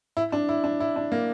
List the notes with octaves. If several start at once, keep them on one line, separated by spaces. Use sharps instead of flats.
E4
D4
E4
D4
E4
D4
A#3